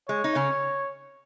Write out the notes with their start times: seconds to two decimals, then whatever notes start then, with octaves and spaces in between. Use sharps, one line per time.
0.09 G#3 C#5
0.24 D#4
0.35 C#3 C#4